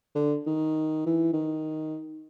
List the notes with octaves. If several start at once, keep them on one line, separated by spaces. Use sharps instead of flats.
D3
D#3
E3
D#3